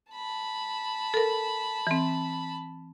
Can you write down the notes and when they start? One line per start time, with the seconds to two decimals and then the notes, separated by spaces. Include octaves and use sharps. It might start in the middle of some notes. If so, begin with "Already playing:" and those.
0.12 A5 B5
1.14 A4 A#4
1.87 E3 C4